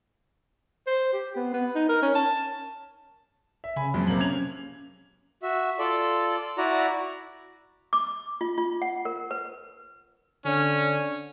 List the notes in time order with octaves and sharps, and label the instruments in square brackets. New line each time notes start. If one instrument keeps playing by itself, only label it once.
[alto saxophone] C5
G4
B3
B3
D#4
A#4
C#4
A5
[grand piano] E5
[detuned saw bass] C#3 [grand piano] G#5 B5
[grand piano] F2 A#2 G#3 [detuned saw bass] F#3
[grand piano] C3 A#3 F#7
[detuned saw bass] C#4 [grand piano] G#6 F7
[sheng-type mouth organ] F#4 E5
F4 A4 D5
E4 F#4 D5 A#5
[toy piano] D6
F4
F4
F#5
A#4
B4
[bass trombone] D3 [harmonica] C#4